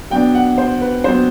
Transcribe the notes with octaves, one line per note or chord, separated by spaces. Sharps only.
F#3 B3 D4 G5
F#5
C5
B4
F#3 B3 D4 C5